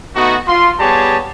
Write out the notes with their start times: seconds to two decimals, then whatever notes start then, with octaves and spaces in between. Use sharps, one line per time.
0.16 A3 B3 D#4 F#4
0.48 F4 C6
0.80 G3 B3 G4 G#4 C#5 A5